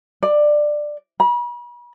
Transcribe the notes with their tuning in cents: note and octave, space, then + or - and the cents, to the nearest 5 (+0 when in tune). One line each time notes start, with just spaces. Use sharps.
D5 +15
B5 -40